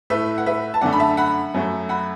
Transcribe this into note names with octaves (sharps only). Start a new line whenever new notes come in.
A2 A3 B4 E5
F#5
B4 E5
A5
F#2 D3 A3 D5 F#5
B5
E5 A5
F#5 B5
F#2 F#3 A3
F#5 B5